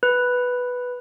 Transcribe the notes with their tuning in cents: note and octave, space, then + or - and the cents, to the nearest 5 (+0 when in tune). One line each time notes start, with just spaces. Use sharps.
B4 +0